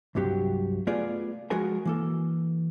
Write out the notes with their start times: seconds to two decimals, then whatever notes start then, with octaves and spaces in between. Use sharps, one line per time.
0.15 C2 G2 C3 F#3 G4
0.87 A3 B3 F4 G#4 D5
1.50 F3 G#3 F#4 G#4 A#4 G#5
1.85 E3 A#3 A4